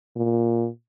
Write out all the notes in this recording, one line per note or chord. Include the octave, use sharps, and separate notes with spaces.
A#2